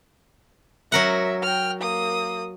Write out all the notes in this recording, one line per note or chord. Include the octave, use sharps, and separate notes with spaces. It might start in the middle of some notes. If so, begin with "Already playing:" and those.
F#3 A#4 E5 F#5
G5 F6
A#3 D#6